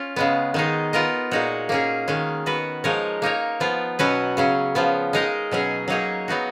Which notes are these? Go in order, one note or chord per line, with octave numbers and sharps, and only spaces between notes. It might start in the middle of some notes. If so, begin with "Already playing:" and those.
Already playing: C#4 F4
C#3 G#3 B3
D#3 G#3 D#4
B3 F4 A#4 D#5
A#2 G#3 D#4 F#4 C#5
A#3 C#4 G#4
D#3 G#3 C#4
B3 F#4 B4
F3 G#3 D#4 A#4 C#5
A#3 D#4 A#4 C#5
F3 B3 F4
B2 F#3 C#4 F#4 B4
C#3 F#3 C#4
C#3 F3 B3
G#3 D#4 A#4 D#5
B2 F#3 C#4 G#4
F#3 A#3 D#4 G#4 C#5
F#3 B3 D#4 F#4